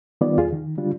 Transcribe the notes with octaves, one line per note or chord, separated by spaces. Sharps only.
D#3 G3 B3 F4 D5
E2 F4 G#4
D#3
D3 G3 D4 F4